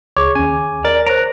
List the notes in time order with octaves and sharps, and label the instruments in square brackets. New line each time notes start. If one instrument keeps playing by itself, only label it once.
[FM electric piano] C#2 [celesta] G#4 D6 [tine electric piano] C#5
[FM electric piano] D#2 C#4 [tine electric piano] G#5
[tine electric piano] A#4 A6 [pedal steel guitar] D5
[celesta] C5 D7 [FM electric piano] C#5 [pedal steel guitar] A#5 F#6